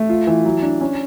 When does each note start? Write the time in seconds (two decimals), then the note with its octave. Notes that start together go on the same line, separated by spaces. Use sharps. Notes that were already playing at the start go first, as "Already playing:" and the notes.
Already playing: A3
0.09 F4
0.27 E3
0.45 F#3
0.62 D4
0.81 C#4